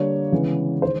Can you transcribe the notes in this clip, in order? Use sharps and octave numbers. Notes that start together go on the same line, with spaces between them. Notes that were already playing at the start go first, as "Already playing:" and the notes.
Already playing: D3 G3 A#3 C#5
C#3 E3 G#3 B3
D#3 G#3 C5